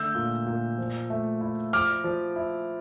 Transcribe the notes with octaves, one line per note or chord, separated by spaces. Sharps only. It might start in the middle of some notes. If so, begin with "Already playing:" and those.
Already playing: D3 A3 E6 G6
A#2
A#2
F3
A3
E4
F3 D6 F6
F3
E4